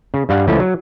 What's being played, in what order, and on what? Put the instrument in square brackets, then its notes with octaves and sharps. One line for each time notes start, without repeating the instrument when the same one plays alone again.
[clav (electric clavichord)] C#3
G2 G3 F5 F#5
C#2 E3 F3 A3 C#4 B4
F#3